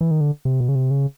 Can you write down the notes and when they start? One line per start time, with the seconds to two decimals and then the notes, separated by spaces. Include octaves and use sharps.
0.01 E3
0.11 D#3
0.21 D3
0.45 C3
0.61 B2
0.69 C#3
0.75 C3
0.91 C#3